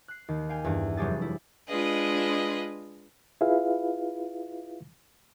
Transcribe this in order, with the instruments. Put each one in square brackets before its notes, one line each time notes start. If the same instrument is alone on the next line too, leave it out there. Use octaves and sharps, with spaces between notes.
[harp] F#6 C7
D#2 D#3
F5 G5 G#5
E2 G2
F1 F#3 G3 G4 G#4 A6
E4
[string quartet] G#3 D4 F4 G#4 B4 D#5
[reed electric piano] E4 F4 G#4 B4 E5 F5